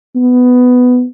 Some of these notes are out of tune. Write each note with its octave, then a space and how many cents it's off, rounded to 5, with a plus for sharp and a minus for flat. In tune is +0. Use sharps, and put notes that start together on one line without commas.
B3 +10